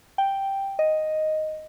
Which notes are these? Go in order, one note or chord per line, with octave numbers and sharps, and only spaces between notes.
G5
D#5